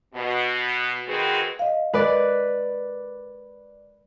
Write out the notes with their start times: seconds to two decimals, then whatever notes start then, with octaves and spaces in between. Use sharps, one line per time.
0.15 B2
1.08 D#3 G#3 C4 F#4 G#4 B4
1.59 D#5 F5
1.94 G#3 B4 D5 D#5